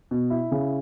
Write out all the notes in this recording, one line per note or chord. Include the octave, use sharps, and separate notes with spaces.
B2
E4
C#3